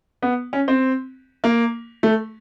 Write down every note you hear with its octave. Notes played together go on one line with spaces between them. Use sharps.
B3
C#4
C4
A#3
A3